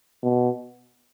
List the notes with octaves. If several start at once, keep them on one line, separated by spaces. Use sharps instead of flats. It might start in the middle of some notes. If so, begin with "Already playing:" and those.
B2